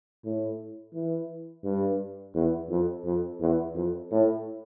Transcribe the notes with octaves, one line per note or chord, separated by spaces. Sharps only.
A2
E3
G2
E2
F2
F2
E2
F2
A2